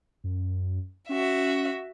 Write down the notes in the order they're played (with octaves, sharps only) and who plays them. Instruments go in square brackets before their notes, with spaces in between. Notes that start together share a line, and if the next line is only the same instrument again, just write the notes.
[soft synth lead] F#2
[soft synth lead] C#4 [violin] F#4 E5